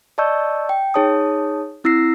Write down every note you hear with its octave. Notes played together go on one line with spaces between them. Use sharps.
D5 D#5 A5 C#6 E6 G6
G5
D#4 G#4 C#5 A5 D#6
C4 E4 E6 A#6 C7